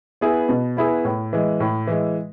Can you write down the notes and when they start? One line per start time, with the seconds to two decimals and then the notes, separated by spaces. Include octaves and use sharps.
0.21 B3 E4 G#4
0.49 B2
0.77 B3 E4 G#4
1.05 A2
1.33 E3 G#3
1.60 A2
1.87 E3 G#3